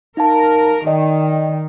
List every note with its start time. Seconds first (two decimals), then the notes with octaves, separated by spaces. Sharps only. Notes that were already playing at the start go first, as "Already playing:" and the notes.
0.17 D#4 A#4 F5 A5
0.87 D#3 D5 D#5 G5